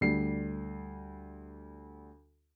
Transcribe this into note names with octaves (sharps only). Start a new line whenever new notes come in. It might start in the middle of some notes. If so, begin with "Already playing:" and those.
D2 G3 C7